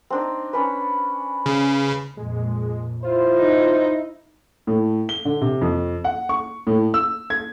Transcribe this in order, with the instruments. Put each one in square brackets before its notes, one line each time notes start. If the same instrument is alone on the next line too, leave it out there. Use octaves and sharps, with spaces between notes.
[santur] C4 D4 D#4
C#4 D4 B4
[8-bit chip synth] C#3
[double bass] F2 A#2 [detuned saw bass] G#3
[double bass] E4 [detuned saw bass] F4 [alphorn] C5
[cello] D#4
[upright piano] A2
G7
D3
C3
F2
F#5
C#6
A2
E6
G#6